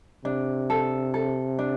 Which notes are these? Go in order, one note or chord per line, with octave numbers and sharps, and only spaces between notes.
C3 D4
A4
A4
D4